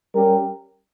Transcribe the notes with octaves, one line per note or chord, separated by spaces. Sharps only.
G3 C#4 G4 A#4